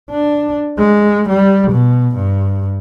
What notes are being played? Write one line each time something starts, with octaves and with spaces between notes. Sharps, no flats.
D4
G#3
G3
B2
G2